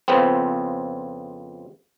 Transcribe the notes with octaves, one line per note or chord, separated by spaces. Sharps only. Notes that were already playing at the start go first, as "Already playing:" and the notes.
F2 C#3 F3 B3 C4